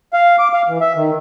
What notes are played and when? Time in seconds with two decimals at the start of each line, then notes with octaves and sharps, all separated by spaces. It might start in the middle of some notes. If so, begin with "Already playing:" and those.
0.13 F5
0.39 D6
0.53 F5
0.68 E3
0.81 E5
0.96 D#3